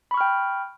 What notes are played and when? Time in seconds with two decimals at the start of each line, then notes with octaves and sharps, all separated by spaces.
0.11 B5
0.14 C#6
0.17 F6
0.21 G5